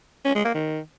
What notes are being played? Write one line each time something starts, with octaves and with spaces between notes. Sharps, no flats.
C#4
G#3
A#3
D#3